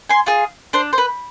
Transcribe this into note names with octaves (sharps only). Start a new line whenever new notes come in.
G#5 C6
F4 G#4
D4 C5
C5
B4